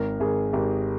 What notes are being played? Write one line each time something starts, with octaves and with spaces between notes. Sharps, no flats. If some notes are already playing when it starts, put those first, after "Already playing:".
Already playing: G#1 A#4
G#1 G#4
G#1 G4